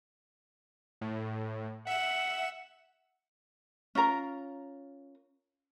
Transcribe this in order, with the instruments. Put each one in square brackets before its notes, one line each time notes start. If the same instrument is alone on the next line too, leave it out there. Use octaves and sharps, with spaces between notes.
[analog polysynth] A2
[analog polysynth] E5 E7 [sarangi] F#5
[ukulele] C#4 F4 A#4 A#5